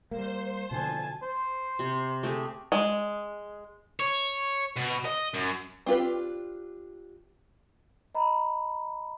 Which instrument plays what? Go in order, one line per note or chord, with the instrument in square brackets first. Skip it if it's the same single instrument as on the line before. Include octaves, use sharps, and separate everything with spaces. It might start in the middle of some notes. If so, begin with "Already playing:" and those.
[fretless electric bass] G3 A#3 [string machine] C5
[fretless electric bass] B2 D3 F3 [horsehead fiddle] G#5 A5
[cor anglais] C5
[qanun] C3
A3 G4 G#4
[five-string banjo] G#3
[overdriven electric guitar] C#5
B2
D#5
F#2
[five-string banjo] C4 D4 F4 G4 B4
[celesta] D#5 A#5 B5